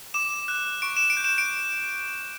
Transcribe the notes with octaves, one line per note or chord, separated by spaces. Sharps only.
D6 E7
F#6
C#6 D7
E7
D7
G6
E7
D7